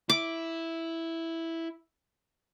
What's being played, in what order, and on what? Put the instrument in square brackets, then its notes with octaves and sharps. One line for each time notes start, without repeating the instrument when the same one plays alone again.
[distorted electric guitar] E4 [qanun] D6